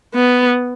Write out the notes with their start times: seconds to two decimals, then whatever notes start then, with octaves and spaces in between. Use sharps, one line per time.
0.14 B3